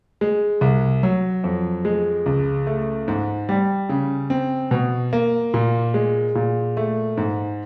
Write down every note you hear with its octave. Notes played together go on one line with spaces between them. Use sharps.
G#3
C2
F#3
F2
G#3
C#2
A3
G#2
G3
C#3
C4
B2
A#3
A#2
G#3
A#2
A3
G#2